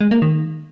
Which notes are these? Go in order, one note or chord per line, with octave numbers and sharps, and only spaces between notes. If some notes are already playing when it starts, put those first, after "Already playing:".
G#3
A#3
D#3